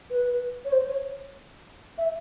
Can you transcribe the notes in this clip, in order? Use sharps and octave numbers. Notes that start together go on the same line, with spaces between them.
B4
C#5
C5
C#5
E5